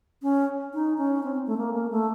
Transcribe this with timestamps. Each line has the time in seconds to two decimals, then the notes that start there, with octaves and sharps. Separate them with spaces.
0.22 C#4
0.74 D#4
0.98 C#4
1.23 C4
1.46 A3
1.58 A#3
1.74 A#3
1.91 A3